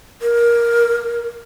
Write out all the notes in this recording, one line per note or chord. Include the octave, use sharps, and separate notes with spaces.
A#4